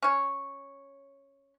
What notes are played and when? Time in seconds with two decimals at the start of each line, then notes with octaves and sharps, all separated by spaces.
0.03 C#4 C#5